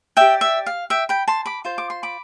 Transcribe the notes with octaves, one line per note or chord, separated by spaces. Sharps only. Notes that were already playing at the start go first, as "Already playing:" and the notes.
G4 D5 E5 G5
E5
F5
E5 G5
G5 B5
A5 C6
B5 D6
F4 C5
D6
C6
B5 D6